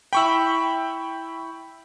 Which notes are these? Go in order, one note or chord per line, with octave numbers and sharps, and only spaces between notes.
E4 G5 B5 C#6 E6